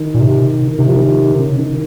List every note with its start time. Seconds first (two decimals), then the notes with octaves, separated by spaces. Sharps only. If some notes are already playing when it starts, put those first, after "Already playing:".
Already playing: D#3
0.14 A#2
0.20 C3
0.78 C3 D#3
0.88 F3
0.97 D#3
1.39 C#3
1.59 D#3